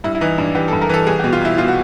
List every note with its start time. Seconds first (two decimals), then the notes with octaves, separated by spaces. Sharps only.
0.04 G2 E4
0.15 E4
0.21 E3 D#4
0.38 G2 D4
0.55 E3 G4
0.68 A4
0.73 G2
0.81 A#4
0.89 E3 A4
1.07 C2 G#4
1.19 G4
1.24 B2
1.33 F4
1.41 C2 E4
1.58 B2 F4
1.68 F#4